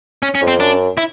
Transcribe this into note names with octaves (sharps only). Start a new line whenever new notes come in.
C#4
C#4
F2
C4
F#2 D4
E4